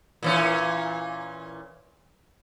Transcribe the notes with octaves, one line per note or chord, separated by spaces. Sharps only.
A#2 E3 C#4